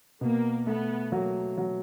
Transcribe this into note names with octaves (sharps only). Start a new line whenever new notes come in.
B2 A#3
A3 B3
F#3 A#3
F#3